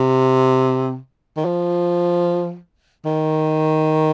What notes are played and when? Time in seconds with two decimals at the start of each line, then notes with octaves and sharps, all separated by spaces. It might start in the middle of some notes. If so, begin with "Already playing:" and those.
Already playing: C3
1.36 D#3
1.45 F3
3.05 D#3